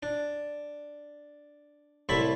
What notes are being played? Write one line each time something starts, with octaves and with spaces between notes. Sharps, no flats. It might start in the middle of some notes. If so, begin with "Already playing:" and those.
D4
C2 A2 E4 E5 A5 B5